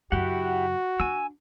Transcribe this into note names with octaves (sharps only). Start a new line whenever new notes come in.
F#2 C#3 E4 F#4 G4 F#5
D4 G#5 E6